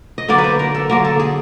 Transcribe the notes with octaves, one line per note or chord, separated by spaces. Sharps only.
D#5
D3 F#3 A#3 D5
B4
C5
A#4
A4
D3 F#3 A#3 A#4
A4
G#4